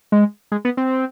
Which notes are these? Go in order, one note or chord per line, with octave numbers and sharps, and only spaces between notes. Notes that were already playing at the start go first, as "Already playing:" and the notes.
G#3
G#3
B3
C4